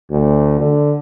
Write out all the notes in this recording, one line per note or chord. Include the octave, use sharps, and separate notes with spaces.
D2
D3